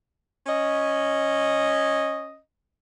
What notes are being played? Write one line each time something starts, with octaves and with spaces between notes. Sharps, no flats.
C#4 D#5